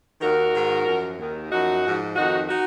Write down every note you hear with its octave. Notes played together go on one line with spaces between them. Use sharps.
D#2 D#3 F#4 A#4
G#2 D#3
F#2 F3
D#2 D#3
F#2 F3 D#4 F#4
G#2 F3
F2 D#3 D#4 F#4
D#4 F#4